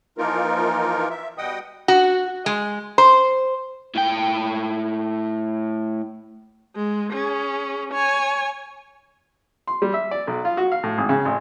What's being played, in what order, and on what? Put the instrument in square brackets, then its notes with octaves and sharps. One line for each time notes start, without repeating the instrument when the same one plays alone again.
[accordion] E3 F3 A#3 D#4 F4 A#4
E5
B2 G3 D#5 F#5 G5 D#6
[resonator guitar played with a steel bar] F#4
G#3
C5
[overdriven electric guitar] A2 G5
[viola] G#3
C#4 G#4
C#5 G#5
[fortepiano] C6
G3
E5
D5
B1
F4
F#4
F5
A2
G#1
C#3
A1